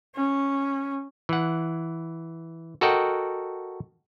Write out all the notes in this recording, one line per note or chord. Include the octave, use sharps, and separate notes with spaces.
C#4
E3 F#5
F#4 A4 A#4 D#5 F#5 G5